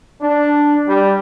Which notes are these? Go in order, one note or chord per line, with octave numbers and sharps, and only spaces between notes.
D4
G3